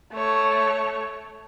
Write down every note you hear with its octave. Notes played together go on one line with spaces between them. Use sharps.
A3 C#5